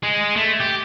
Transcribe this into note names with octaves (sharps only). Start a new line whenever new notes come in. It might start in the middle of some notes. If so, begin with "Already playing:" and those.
G#3
A3
G4